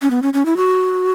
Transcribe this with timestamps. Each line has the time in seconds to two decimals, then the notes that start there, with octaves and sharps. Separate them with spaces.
0.02 C#4
0.11 B3
0.22 C#4
0.34 C#4
0.46 E4
0.57 F#4